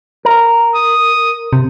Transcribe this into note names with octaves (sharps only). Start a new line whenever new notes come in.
A#4
D#6
C3